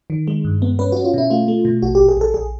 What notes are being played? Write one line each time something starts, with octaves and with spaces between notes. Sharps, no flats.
D#3
G#3
G2
B3
C#4 B4
F#4
C#4
F4
B2 E4
A3 F4
A3
B2
A#1 F#4
G4
A#1
G#4
A#1 A4
A#1 G#4